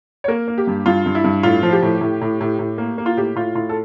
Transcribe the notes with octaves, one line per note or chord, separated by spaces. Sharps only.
C#5
A#3 A#4
A#3
G4
G2
G2 F4
G2
E4
G2
A2 F4
F3
G4
A2
A2
A2
A2
A2
A#3
A#3
F4
A2 G4
A2 F4
A2 F4
A4